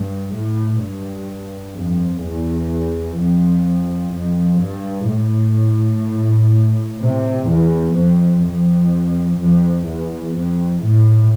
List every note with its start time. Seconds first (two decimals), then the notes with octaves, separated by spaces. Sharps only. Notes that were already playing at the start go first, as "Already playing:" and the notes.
Already playing: G2
0.33 A2
0.81 G2
1.76 F2
2.23 E2
3.18 F2
4.14 F2
4.62 G2
5.10 A2
7.00 C3
7.48 E2
7.95 F2
8.43 F2
9.39 F2
9.85 E2
10.34 F2
10.81 A2